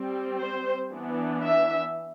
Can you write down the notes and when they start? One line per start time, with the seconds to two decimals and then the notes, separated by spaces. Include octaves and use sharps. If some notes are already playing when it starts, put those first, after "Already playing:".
Already playing: G3 C4
0.37 C5
0.90 E3 B3 D4
1.43 E5